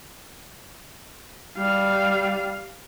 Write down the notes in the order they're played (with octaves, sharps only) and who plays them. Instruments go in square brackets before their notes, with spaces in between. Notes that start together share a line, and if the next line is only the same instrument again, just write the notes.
[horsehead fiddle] G3 F5